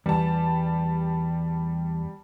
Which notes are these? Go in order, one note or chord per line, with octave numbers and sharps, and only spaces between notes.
E2 G3 A5